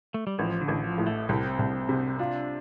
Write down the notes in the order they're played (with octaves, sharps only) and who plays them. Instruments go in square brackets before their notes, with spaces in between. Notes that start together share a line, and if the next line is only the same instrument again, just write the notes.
[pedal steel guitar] A3
G3
[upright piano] A1 [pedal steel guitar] F3
[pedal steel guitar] D3
[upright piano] A1
[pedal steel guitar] F3
[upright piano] A2
[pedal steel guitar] A3
[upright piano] C2 [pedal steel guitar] C4
[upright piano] C2
C3
[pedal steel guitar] D4 [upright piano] F4